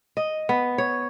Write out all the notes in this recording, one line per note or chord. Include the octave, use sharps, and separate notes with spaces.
D#5
B3
C#5